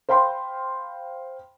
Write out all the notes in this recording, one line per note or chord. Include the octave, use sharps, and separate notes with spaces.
C5 F5 G5 B5 C6